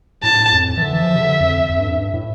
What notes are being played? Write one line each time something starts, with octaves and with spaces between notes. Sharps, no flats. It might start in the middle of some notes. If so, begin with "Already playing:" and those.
A2 A5
F2
E3
D3 E5
E3
F3
C3
D3
F2
F2
G2
F2
G2
A2